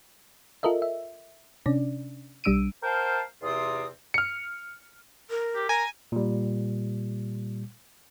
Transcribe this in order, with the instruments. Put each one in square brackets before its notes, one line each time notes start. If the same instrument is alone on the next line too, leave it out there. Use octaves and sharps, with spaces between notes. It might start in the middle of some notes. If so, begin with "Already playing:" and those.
[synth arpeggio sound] F4 A4 A#4 D#5 E5
E5
C3 C#4 D4 D5
B1 G3 D4 E6 D7 D#7
[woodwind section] A#4 C5 F5 G5 A5
E2 C3 C4 F4 D#6
[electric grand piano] F6 C#7
[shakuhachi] A#4
[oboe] G4
[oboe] A#4 [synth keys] G#5
[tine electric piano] A#2 G3